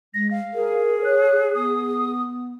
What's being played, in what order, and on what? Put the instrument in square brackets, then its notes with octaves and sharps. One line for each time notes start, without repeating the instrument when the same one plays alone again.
[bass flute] G#3 [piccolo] A#6
[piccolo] F5
[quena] G#4 [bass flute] A#4
[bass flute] C#5 [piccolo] F#6
[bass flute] B3 [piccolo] D#6